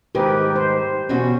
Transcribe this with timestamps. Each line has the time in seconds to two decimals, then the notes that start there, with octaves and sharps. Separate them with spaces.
0.15 G#2 D#3 G4 A#4 B4
0.56 C5
1.09 E2 B2 C#4 F#4